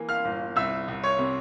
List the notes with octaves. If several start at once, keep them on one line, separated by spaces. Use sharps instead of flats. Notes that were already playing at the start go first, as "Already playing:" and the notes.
Already playing: E3 A#3
F5 F6
G1
C2 E5 E6
C2
C#5 C#6
C3